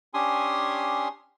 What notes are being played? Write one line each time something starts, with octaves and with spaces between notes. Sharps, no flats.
C#4 D4 G4 G#5 C6 D#6